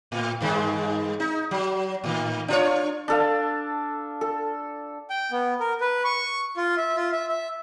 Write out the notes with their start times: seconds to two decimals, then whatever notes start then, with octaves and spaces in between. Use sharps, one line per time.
0.12 A2
0.41 G2 D#3 G#3
1.20 D#4
1.51 F#3
2.04 A2 D#3
2.48 D4 F4 C#5
3.08 D4 A4 F5
4.21 A4
5.10 G5
5.31 B3
5.60 A#4
5.81 B4
6.04 C#6
6.57 F4
6.77 E5
6.96 F4
7.12 E5
7.29 E5